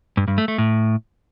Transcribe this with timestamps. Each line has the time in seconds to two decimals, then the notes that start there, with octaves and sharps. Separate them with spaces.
0.17 G2
0.28 G2
0.38 A3
0.48 A3
0.58 A2